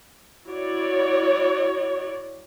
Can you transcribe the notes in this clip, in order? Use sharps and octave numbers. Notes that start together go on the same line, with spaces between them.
E4 F#4 C#5 D5